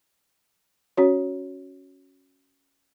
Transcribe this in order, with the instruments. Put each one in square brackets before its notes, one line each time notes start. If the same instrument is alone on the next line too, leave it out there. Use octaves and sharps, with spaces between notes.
[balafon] C#4 F#4 C#5